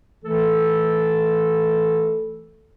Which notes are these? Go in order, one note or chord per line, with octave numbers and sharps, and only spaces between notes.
E3 A3 A4